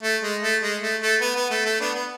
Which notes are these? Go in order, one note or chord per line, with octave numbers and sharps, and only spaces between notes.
A3
G#3
A3
G#3
A3
A3
B3
B3
A3
A3
B3 D4
B3